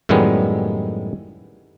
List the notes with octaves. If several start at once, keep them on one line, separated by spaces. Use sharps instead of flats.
F#2 A2 D#3 G3 G#3 B3